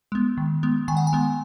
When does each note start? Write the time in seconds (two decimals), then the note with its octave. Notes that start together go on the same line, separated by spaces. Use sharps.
0.12 G#3 B3
0.37 D#3
0.63 G#3 B3
0.88 D#3 G#5
0.97 F#5
1.07 G#5
1.13 G#3 B3